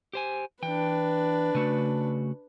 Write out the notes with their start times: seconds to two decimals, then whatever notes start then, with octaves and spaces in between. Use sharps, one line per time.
0.13 G4 C5 G#5
0.62 E3 D4 B4 G5
1.55 C#3 A3 F#4